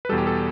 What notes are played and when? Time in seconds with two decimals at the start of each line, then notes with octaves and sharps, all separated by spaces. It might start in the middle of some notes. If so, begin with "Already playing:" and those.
0.05 B4
0.09 E2 B2 G3 A4
0.18 G4
0.27 A4